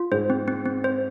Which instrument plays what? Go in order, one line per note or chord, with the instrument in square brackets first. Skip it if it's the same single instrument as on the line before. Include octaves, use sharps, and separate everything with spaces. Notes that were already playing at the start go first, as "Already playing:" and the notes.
Already playing: [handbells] F4
[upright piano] G#2 [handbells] C5
[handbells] C4
C4
C4
C5